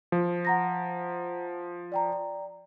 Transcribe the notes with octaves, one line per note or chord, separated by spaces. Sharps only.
F3
F#5 A#5 A#6
D5 G5 A#5